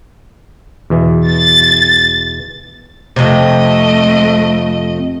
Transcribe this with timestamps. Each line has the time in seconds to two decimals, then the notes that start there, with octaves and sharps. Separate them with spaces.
0.90 E2 B2 E3
1.28 A6
3.16 F2 C3 A3 D#5